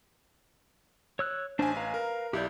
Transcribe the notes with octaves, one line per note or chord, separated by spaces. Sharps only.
C#5 E6 F#6
A1 D4 C5 G#5
B4 F5 A#5
A#4
B1 E4 G4 D5 G6